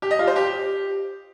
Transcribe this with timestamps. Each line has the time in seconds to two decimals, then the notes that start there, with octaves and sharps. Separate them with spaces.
0.02 G4
0.11 D#5
0.19 F4
0.27 C5
0.36 G4